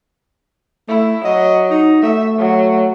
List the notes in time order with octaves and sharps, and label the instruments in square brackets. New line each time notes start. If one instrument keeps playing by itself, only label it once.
[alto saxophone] A3 [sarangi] E4
[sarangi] F#3 [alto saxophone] D#5
[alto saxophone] D#4
[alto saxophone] A3 [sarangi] E5
[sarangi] F#3